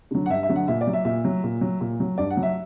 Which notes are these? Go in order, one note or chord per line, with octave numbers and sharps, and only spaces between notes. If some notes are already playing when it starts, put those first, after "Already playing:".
D3 F#3
F#5
G2 E5
E5
D3 F#3
F#5
A#2 E5
D5
F#3
E5
A#2 E5
F#3
A#2
F#3
A#2
F#3
G2 D5
F#5
F#3
E5